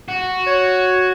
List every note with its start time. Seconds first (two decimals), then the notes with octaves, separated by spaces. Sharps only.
0.08 F#4
0.47 C#5